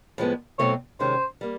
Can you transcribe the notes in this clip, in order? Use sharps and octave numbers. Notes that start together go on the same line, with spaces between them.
A2 F3 G#3 B3
B2 F#3 A3 C4 E4 C#5
C3 D#3 G#3 C#4 C5
G3 A#3